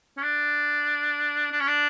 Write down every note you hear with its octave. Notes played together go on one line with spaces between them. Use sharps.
C#4
D4
D4
C#4
D4